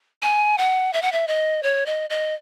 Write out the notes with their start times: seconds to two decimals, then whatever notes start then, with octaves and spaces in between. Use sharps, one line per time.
0.22 G#5
0.58 F#5
0.93 E5
1.02 F#5
1.12 E5
1.28 D#5
1.63 C#5
1.86 D#5
2.10 D#5